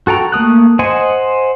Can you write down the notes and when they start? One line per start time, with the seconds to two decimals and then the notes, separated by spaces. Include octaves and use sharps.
0.07 F#4 A4 G5 A#5
0.32 A3 A#3 D#6 F#6
0.79 C5 D#5 F#5 G#5